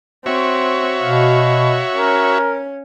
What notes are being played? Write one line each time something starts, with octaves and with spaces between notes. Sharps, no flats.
C4 F#4 C#5 E5
B2 F5
C#4 A#4